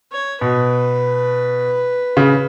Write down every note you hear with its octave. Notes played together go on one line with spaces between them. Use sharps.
C#5
B2 B4
C#3